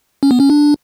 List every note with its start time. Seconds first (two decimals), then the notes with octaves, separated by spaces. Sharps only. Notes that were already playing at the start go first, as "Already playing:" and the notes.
0.23 C#4
0.31 B3
0.40 C#4
0.50 D4